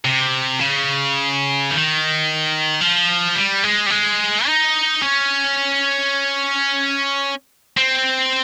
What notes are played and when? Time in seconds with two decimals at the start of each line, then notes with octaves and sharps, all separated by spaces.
0.05 C3
0.59 C#3
1.70 D#3
2.81 F3
3.36 G3
3.64 G#3
3.86 G3
3.90 G#3
4.47 D#4
5.02 C#4
7.77 C4